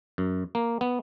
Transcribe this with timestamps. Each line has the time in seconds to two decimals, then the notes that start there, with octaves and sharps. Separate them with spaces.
0.18 F#2
0.55 A#3
0.81 B3